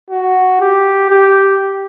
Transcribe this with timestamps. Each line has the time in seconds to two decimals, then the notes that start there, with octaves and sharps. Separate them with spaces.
0.10 F#4
0.60 G4
1.10 G4